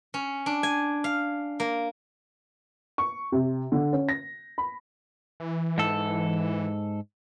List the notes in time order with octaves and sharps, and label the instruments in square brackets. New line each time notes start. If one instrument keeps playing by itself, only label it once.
[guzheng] C#4
D4
G#5
F5
A#3
[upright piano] C#6
C3
D3
C#4
A#6
B5
[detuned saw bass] E3
[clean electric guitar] G#2 A4